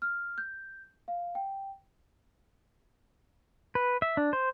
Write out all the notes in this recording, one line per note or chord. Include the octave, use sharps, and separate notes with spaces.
F6
G6
F5
G5
B4
E5
D4
C5